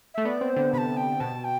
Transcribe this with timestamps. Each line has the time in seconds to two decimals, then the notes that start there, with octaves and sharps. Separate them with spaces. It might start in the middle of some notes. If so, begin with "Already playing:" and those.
0.14 A3 E5
0.25 B3 D5
0.41 C4
0.50 C5
0.56 D3
0.73 C3 A5 B5
0.97 G5
1.20 B2 A5
1.44 G5